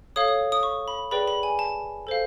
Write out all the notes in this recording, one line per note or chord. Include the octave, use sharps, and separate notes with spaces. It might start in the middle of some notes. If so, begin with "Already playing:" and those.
A4 C#5 F5 D#6
D#6
D#6
C#6
B5
G#4 B4 D5 G5 B5
B5
G#5
A5
A4 C5 F5